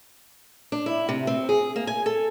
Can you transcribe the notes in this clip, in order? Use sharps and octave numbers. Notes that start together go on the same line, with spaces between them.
D4
E4
C3
C4
G#4
A#3
G#5
A4